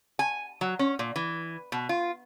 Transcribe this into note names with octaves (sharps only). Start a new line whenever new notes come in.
G#5
F#3
C#4
A#2
E3
B2
F4